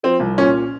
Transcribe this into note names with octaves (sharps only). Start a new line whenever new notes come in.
F3 C4
C2
A#2 C#4